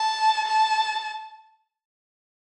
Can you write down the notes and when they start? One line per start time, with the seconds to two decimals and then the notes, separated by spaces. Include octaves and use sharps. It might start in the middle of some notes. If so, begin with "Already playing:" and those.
Already playing: A5
0.47 A5